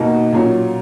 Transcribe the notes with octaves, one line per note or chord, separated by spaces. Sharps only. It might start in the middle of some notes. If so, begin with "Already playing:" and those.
Already playing: B2 A#3 D#4 F#4
A#2 F#3 C#4